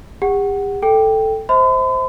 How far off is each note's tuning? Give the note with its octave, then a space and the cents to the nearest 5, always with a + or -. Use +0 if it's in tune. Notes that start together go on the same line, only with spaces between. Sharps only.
G4 +45 F#5 +10
A4 +0 G5 +0
C5 +0 E5 -45 B5 +45